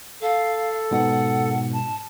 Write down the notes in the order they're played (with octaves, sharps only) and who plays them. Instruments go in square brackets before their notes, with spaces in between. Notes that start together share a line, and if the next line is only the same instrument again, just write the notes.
[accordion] A4 [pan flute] F5
[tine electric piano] G#2 B2 [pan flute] F#5
[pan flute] A5